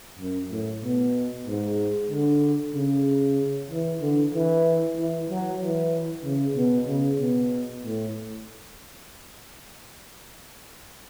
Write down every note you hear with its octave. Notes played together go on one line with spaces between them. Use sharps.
F#2
A2
B2
G#2
D3
C#3
E3
D3
E3
E3
F#3
E3
C#3
B2
C#3
B2
A2